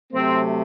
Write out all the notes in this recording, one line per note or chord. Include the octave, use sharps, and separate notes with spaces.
C3 F#3 A3 C4